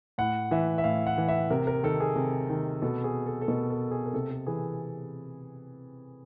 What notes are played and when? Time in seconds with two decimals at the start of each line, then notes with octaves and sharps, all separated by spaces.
0.18 A2 F#5
0.51 E3 E5
0.78 E5
0.84 A2 F5
1.07 F#5
1.18 E3
1.28 E5
1.50 C3 A#4
1.67 A#4
1.83 D#3 A4
2.00 G#4
2.16 C3
2.49 D#3
2.82 B2 A4
3.04 G#4
3.26 A4
3.41 A4
3.48 B2 A#4
3.71 A4
3.91 G#4
4.06 A#4
4.13 C3 A4
4.31 A4
4.47 E3 G#4